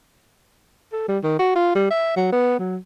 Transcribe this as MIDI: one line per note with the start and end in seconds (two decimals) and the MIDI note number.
0.93 1.07 69
1.08 1.18 55
1.24 1.37 51
1.39 1.52 66
1.55 1.74 65
1.75 1.87 55
1.90 2.13 76
2.16 2.32 54
2.32 2.59 59
2.59 2.77 54